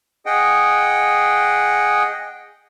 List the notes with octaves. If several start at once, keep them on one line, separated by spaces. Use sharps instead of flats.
G#4 D#5 F#5 G5